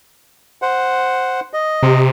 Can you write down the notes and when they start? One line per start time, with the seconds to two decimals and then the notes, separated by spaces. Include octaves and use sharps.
0.62 C5 F#5
1.53 D#5
1.83 C3